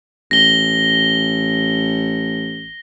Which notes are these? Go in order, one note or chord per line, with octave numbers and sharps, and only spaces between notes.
A1 A#6 G7